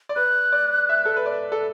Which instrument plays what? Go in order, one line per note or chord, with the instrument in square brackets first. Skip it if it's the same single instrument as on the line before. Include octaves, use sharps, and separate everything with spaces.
[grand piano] D5
[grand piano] B4 [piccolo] F#6
[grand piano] D5
E5
A4
B4
D5
A4